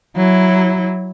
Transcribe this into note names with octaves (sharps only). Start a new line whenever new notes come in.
F#3 E4